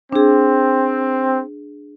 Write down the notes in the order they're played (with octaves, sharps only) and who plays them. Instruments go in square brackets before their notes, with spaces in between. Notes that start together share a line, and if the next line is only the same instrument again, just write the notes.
[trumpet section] C4 [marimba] D4 G#4